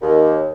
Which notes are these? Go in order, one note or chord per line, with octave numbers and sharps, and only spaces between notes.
D#2